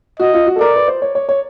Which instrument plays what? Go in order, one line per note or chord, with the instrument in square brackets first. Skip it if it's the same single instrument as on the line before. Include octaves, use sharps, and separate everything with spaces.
[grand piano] F#4 [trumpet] D#5
[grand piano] F4
F#4
A4
[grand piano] A#4 [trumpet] D5
[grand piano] B4
C5
C#5
C#5
C#5